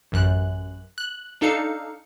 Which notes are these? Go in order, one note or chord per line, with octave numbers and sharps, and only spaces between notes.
A1 F#2 F#6
F#6
D4 D#4 A4 F5 C#7